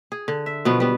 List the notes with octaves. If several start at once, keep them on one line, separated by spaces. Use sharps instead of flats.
G#4
D3
E5
B2 F3 F#3 B3
G3 B3